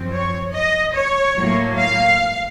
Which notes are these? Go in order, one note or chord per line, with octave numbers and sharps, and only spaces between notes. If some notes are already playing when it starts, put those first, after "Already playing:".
Already playing: F#2 F3 C4
C#5
D#5
C#5
A2 F#3 A#3
F5